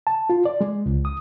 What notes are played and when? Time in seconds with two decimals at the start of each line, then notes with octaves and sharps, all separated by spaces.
0.07 A5
0.30 F4
0.45 D5
0.61 G#3
0.86 C#2
1.05 D#6